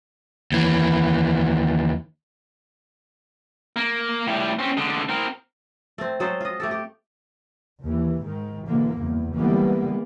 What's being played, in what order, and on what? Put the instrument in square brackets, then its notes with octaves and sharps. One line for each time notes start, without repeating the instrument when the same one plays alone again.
[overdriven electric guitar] D#2 E3
[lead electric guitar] A#3
A2 G3
C4 C#4
D3 G#3
C4 A#4
[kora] A3 C4
F#3 G#3 A4 C5
F4 D#5
A3 G4 A4
G4
[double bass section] D#2 E3
G#2 D#3
B2 D3 E3 A#3
F#1 E2 G2
D3 E3 G3 G#3 A#3 B3